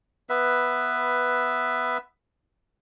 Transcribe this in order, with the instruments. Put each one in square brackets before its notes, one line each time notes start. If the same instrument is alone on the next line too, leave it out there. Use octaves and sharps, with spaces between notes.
[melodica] B3 B4 E5